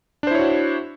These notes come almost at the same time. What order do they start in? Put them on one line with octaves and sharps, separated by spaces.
D4 C5 E4 C#5 F#4